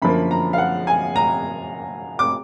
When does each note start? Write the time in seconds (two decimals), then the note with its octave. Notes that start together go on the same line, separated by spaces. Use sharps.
0.02 F#2 D3 F3 A#3 B5
0.31 A#5
0.53 F5
0.58 F#5
0.87 G#5
1.16 A#5
2.19 D6